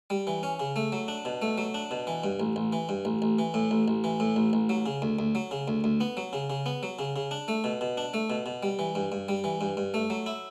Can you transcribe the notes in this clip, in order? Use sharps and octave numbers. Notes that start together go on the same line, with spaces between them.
G3
E3
C#4
C#3
A3
F#3
D4
B2
A3
F#3
D4
B2
E3
G2
A1
A1
E3
G2
A1
A1
E3
A2
A1
A1
E3
A2
A1
A1
F#3
C#3
D2
D2
F#3
C#3
D2
D2
B3
F#3
C#3
C#3
B3
F#3
C#3
C#3
D4
A3
B2
B2
D4
A3
B2
B2
G3
E3
G2
G2
G3
E3
G2
G2
A3
F#3
E4